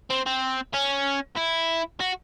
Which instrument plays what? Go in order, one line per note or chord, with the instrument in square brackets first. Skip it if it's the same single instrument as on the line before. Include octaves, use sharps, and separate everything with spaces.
[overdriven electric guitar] C4
C4
C#4
E4
F#4